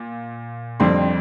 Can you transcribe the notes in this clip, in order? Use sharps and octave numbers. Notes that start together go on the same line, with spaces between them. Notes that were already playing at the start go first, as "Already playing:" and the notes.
Already playing: A#2
F2 D3 G3 C4 C6